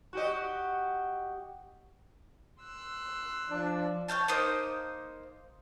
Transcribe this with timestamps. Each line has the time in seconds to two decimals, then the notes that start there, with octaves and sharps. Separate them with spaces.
0.13 F#4 G4 D#5
2.61 C6 E6 F#6
3.49 F3 D4
4.08 C#5 F5 G5 A5
4.28 A#3 D#4 C5 D#6